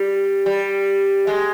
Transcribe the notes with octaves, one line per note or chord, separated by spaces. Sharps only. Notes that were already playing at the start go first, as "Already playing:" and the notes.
Already playing: G3
G3
G#3